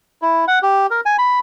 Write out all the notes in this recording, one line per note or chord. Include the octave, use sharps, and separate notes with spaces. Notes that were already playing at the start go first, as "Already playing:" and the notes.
E4
F#5
G4
A#4
G#5
B5